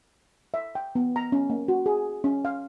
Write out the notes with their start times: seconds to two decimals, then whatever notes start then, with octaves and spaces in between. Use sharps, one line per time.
0.54 E5
0.75 G5
0.95 B3
1.16 A#5
1.32 C#4
1.50 A#3
1.68 F#4
1.86 G#4
2.24 C#4
2.45 F5